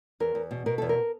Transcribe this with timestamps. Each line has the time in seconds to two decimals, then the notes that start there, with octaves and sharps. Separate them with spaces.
0.20 E2 A#4
0.35 E2
0.51 B2
0.66 B2 A#4
0.78 E2 A4
0.89 A#4